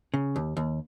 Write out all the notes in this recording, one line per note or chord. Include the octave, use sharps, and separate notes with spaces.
C#3
D#2
D#2